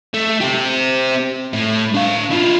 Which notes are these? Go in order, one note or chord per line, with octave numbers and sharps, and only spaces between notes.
A3
C4 G4
A2
D4 F5
E4 F4